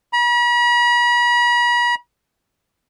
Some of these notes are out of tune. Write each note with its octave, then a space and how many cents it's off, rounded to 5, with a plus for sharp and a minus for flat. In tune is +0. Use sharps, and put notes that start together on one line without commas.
B5 -45